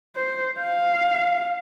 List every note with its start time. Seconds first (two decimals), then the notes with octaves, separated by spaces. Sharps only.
0.16 C5
0.60 F5